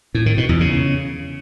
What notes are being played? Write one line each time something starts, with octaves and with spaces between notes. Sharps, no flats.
A2
D#3
B2
E2
C#3